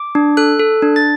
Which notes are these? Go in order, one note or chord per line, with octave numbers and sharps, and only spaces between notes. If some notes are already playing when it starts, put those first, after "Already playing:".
Already playing: D6
D4
A4 F#6
A4
D4
A6